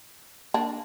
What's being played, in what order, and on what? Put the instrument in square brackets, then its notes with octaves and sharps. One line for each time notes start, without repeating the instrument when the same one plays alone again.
[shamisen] A#3 D4